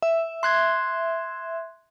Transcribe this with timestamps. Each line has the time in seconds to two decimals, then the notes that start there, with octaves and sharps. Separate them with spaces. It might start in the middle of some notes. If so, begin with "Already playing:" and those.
0.02 E5
0.43 C6 F#6 G#6